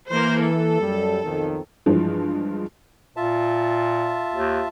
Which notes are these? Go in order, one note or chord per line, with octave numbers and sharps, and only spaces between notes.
E3 A#3 C5
A4
F#2 G3
B1 F2 D#3
G2 E3 F3 G#3
A#2 F4 E5 A5
D#2